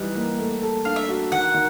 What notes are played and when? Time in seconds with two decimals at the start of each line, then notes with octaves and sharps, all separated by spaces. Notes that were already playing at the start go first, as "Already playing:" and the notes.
Already playing: E3 G3 D#4 F#5
0.15 A#3
0.39 A3
0.62 A4
0.85 D4 F5
0.96 E5
1.08 F#4
1.32 D#3 F#5
1.54 D#3